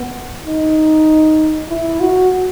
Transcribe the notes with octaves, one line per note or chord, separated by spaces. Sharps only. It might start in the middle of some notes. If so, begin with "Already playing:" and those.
Already playing: B3
D#4
E4
F#4